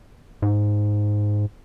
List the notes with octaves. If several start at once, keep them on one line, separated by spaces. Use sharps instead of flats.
G#2